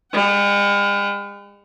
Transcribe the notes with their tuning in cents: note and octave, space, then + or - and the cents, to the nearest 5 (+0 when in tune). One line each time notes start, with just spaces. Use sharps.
G#3 -45 F#5 +40